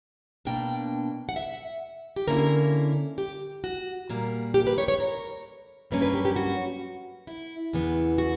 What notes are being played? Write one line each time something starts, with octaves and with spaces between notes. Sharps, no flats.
B2 A#3 D4 G5
F#5
E5
G4
D3 A#3 C#4 E4 A#4
G4
F#4
A#2 G3 A#3
G4
B4
C#5
C#5
A#4
G2 F#3 A#3 C#4 B4
B4
G4
G4
F#4
E4
E2 C#3 E3 B3
F#4